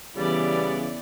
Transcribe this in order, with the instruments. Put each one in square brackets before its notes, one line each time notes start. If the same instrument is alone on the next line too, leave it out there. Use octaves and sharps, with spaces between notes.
[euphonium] C#3 [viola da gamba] E3 [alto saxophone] G3 [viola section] B3 D5